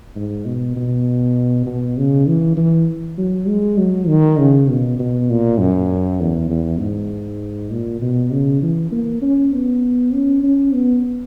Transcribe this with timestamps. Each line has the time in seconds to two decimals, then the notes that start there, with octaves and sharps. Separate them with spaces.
0.16 G#2
0.46 B2
0.76 B2
1.66 B2
1.98 C#3
2.27 E3
2.57 E3
3.18 F#3
3.47 G#3
3.78 F#3
4.08 D#3
4.39 C#3
4.69 B2
4.99 B2
5.30 A#2
5.60 F#2
6.21 E2
6.50 E2
6.80 G#2
7.71 A#2
8.01 B2
8.31 C#3
8.63 E3
8.92 A#3
9.22 C#4
9.53 B3
10.13 C#4
10.43 C#4
10.73 B3